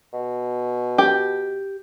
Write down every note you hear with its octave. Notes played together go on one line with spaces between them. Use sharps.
B2
G4